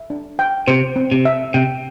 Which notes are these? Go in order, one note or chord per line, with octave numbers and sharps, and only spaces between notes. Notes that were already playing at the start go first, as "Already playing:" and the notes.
Already playing: E5
D4
G5
C3 C5
C4
C3
E5
C3 G5